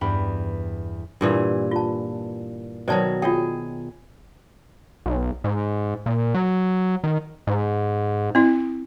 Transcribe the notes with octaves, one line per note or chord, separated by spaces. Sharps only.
E2 G2 G3 B3 G5 B5
G2 A#2 E3
F4 A5
B2 D#3 F#3 C5 D5 A5
F4 G#4 C#5 G5
B1
G#2
A#2
F#3
D#3
G#2
C4 E4